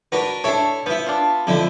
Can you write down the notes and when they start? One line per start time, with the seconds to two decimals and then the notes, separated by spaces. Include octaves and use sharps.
0.12 D4 F#4 A#4 B4
0.44 D4 E4 A4 C#5
0.86 F3 B3 E4
1.06 D4 F4
1.47 F2 D3 E4